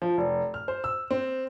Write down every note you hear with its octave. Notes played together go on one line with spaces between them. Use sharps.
F3
F1
F6
C5
E6
C4